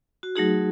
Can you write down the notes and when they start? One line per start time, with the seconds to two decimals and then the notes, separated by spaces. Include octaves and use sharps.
0.23 F#4
0.35 F#3 A3 D#4 F#4 G#4